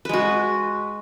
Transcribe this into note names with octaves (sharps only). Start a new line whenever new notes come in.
G#3 F#4 B4